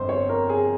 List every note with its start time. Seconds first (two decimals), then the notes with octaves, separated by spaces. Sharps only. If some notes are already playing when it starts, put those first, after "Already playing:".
Already playing: G1 F2 C5
0.09 C#5
0.29 A#4
0.49 G#4